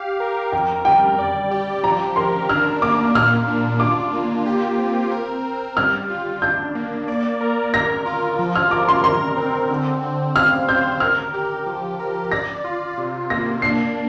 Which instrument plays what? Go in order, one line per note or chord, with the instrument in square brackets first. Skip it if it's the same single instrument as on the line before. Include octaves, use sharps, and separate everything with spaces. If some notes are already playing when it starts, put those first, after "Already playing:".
Already playing: [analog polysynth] G4 F5
A#4
[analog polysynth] F2 [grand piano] G5
[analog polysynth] G3 [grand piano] G5
[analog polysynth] D5
G4
[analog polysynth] F3 [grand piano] A#5
[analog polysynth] A#4 [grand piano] C6
[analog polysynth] D4 [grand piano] F6
[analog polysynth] A#3 [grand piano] D6
[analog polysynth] A#2 [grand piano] F6
[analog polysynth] D4
[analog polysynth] F4 [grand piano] D6
[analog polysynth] A#3
G4
C4
A#4
C4
[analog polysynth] G3 [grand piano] F6
[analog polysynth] F4
[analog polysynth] D4 [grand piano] G6
[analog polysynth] A#3
D5
A#4
[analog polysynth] A#4 [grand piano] A#6
[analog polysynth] F4
F3
[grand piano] F6
[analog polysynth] A#4 [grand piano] D6
[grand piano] C6
[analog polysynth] A#4 [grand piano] C6
[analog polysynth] C4
D3
C4
[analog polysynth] F5 [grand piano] F6
[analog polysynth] C5 [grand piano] G6
[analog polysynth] A#4 [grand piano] F6
[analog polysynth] G4
F3
A#4
[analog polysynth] D5 [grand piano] A#6
[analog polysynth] F4
C3
[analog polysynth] A#3 [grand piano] A#6
[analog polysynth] D4 [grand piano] C7